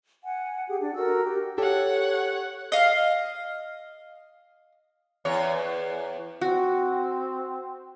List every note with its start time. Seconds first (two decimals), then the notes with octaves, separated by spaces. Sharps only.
0.24 F#5 G#5
0.67 G4 G#4
0.80 D4 D5
0.94 F#4 A4 A#4 E6
1.24 G4
1.58 G4 A4 C#5 F#5 G5
2.72 D#5 F5
5.25 E2 C#5
6.41 C4 F#4